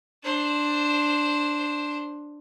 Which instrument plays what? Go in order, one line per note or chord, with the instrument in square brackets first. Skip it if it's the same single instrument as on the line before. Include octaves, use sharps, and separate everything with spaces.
[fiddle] D4 C5